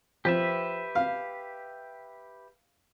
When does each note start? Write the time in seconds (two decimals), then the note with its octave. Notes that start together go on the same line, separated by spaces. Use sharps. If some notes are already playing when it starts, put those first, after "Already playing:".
0.25 F3 G4 B4 E5
0.95 F5